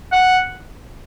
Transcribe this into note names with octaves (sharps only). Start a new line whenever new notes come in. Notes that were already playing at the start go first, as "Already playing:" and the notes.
F#5